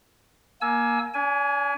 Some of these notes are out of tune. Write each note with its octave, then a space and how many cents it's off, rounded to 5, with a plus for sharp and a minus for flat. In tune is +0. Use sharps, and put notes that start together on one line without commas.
A#3 +15 G#5 +25 E6 +0
D4 -45 G#5 +10